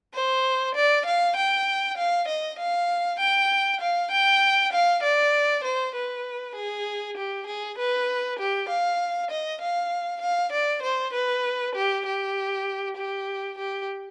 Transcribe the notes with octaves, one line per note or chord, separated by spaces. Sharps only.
C5
D5
F5
G5
F5
D#5
F5
G5
F5
G5
F5
D5
C5
B4
G#4
G4
G#4
B4
G4
F5
D#5
F5
F5
D5
C5
B4
G4
G4
G4
G4